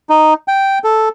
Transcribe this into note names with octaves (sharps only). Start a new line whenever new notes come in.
D#4
G5
A4